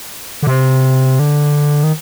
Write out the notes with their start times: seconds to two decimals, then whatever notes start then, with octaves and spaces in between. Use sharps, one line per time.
0.43 D3
0.47 C3
1.19 D3
1.84 D#3